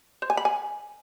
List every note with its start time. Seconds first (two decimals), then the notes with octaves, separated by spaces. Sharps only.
0.22 C5
0.30 G#5
0.37 B5
0.45 G#5